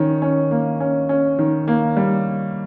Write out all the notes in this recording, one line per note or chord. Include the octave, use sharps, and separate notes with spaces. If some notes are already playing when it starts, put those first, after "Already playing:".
Already playing: D#3 C#4
C#4
A#3
C#4
C#4
D#3
A#3
G3